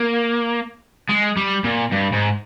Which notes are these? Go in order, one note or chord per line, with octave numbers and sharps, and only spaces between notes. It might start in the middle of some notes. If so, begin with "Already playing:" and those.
Already playing: A#3
G#3
G3
A#2
G2
G#2